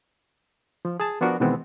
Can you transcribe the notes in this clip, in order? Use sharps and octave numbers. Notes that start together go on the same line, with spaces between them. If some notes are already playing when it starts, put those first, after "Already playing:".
F3
G#4 A5
F3 B3 D4 F#4 A#4
B2 D#3 E3 G#3 B3 C4